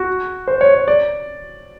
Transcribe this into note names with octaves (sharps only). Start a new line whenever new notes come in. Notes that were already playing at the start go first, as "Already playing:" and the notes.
Already playing: F#4
C5
C#5
C#5
D5